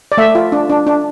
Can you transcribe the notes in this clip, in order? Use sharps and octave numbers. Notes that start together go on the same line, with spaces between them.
D5
A3 E5
F4
D4
D4
D4